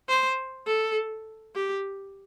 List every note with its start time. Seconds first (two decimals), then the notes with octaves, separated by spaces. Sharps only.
0.09 C5
0.67 A4
1.55 G4